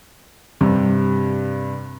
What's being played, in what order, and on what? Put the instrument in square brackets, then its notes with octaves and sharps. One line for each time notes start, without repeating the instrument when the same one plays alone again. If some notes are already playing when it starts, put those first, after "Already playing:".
[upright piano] G2 C3